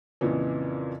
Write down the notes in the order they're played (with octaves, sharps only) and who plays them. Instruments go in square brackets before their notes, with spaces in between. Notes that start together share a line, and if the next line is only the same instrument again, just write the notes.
[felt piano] F2 A#2 C#3 E3